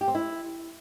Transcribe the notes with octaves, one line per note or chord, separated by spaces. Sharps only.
G4
C4
E4